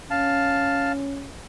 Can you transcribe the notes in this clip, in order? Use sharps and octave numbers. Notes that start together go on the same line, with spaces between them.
C#4 F5 A5